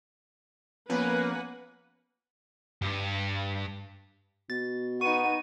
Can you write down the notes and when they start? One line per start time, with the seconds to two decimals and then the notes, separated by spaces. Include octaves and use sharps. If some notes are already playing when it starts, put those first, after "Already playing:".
0.90 F3 A#3 B3 C#4 B4 F#5 G#5
2.82 G2
4.50 B2 A6
5.01 B3 D#4 F#5 C#6 D#7